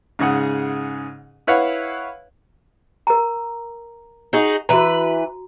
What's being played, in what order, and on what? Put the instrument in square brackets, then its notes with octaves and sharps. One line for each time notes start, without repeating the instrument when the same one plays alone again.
[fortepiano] G#2 C#3 G#4 F#5
E4 B4 C#5 F5 F#5
[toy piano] A#4 A#5
[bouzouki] D#4 F#4 G#4
[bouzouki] E3 B4 [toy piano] F#4 A#5